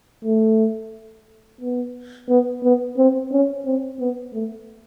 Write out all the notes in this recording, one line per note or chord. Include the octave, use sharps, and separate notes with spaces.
A3
B3
B3
B3
C4
C#4
C4
B3
A3